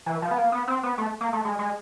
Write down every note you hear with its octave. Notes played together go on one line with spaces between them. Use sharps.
E3
F3
B3
A#3
B3
C4
B3
A3
A#3
A3
G#3
G#3